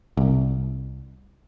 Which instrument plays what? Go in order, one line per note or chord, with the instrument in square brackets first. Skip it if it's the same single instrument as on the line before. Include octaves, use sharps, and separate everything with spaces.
[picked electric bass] C2